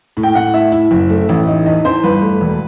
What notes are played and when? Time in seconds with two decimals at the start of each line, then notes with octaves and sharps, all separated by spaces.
0.17 A2
0.23 G5
0.35 A2 F#5
0.54 A2 E5
0.72 E4
0.91 F#1
1.10 A3
1.29 A1
1.47 D#4
1.66 E2 D#5
1.85 E2 C5
2.03 G1 B4
2.22 A3
2.41 E1